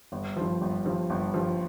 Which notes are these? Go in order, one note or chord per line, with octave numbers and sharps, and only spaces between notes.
G1
G2 F3
G1
G2 F3
G1
G2 F3